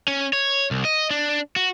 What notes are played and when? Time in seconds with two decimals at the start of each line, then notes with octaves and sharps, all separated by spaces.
0.08 C#4
0.33 C#5
0.71 C2
0.85 D#5
1.11 D4
1.56 F#4